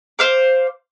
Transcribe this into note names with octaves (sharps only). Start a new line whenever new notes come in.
C5 F5 D6